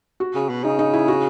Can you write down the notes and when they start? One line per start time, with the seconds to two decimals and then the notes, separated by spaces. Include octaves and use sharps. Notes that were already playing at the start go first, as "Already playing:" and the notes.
0.20 F#4
0.35 C#3
0.49 B2
0.64 C#3 D#4
0.79 D#4
0.93 E4
1.08 F#4